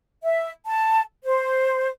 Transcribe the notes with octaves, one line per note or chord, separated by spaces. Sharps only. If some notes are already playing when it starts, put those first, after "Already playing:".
E5
A5
C5